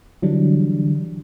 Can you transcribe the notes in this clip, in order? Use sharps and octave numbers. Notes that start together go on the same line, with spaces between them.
D3 E3 F#3 G3 D4